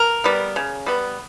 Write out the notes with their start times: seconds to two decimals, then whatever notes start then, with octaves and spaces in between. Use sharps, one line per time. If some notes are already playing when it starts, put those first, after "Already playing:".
Already playing: A#4
0.24 G3 B3
0.56 C#3
0.86 G3 B3